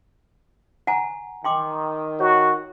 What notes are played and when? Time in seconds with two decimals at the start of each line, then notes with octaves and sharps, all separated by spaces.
0.87 F#5 G#5 A#5
1.44 D#3 G5 C6 D6
2.20 F#4 C#5